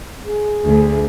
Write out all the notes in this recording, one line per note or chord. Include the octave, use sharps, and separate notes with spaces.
G#4
D2